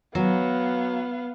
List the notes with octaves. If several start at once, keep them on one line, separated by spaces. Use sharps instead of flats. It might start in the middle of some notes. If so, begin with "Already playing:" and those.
F#3 B3 F5